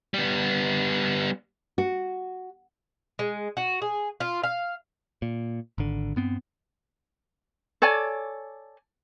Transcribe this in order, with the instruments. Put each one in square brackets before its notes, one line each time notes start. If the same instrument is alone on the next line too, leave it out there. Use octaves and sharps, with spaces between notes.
[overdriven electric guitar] G3 B3
[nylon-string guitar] F#4
[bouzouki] G#3
F#4
G#4
F4
F5
[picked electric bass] A#2
G#1 D3
G2 B3 C4
[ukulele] A4 C#5 D5 G#5